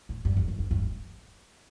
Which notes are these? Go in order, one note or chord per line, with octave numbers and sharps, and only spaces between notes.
A2
G2
F2
F#2
F2
G2